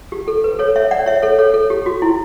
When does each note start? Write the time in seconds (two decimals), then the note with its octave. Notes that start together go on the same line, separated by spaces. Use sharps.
0.12 G4
0.28 A4
0.44 B4
0.59 A4 C#5
0.76 C#5 E5
0.91 D5 F#5
1.06 C#5 E5
1.22 A4 C#5
1.39 A4 C#5
1.54 A4
1.70 G4
1.86 F#4
2.02 E4